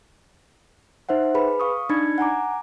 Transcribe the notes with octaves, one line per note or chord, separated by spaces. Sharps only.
D#4 C5 E5 F#5
G#4 B4 B5
F5 C#6 D#6
D4 D#4 B5 G#6 C#7
F#5 G#5 A#5 D6